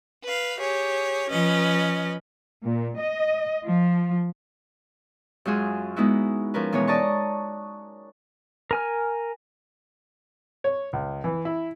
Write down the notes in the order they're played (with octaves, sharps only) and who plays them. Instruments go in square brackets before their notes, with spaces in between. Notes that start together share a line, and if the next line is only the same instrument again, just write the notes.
[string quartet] B4 F5
G4 G#4 C#5
F3 C#4 B4 D#5
[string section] A#2
D#5
F3
[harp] F#2 G#3 F4 F#4 G#4
G#3 B3 D#4 E4 F#4
F3 C#4 A#4 B4
B2 E3 G#3 C#5
D5 D#5 A5 A#5 C#6
[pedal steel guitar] A#4 G#5 F6
[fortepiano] C#5
C#2
E3
E4